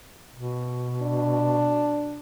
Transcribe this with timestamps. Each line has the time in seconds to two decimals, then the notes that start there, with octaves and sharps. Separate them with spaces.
0.34 B2
1.02 D4